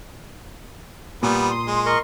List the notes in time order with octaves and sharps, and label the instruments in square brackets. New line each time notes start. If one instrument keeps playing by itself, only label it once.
[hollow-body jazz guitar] A#2 [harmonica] G3 B3 [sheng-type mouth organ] D#6
[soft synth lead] C6
[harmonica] G#3
[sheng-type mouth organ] A#4 D#5 C#6